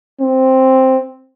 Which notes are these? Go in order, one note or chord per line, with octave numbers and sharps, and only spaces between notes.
C4